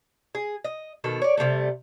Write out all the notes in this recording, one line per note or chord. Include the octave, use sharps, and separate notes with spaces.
G#4
D#5
B2 D#3 A4
C#5 D5
C3 D#3 G3 A3